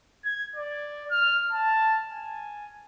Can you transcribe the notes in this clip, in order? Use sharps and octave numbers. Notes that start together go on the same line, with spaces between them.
G#6
D5
F6
A5
G#5